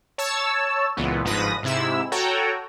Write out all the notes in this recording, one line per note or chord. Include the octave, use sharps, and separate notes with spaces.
C#5 A5 E6
C#2 A#2 E3 B3
G1 G#2 F3 B4 D#6 A#6
G#2 C3 E4 E6
F#4 A4 C#5 G5 A#5